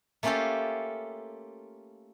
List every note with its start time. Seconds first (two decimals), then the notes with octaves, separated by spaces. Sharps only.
0.23 A3 A#3 C#4 F4 G4 A4